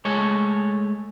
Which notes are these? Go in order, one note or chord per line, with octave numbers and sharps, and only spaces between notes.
G#3 A3 C#5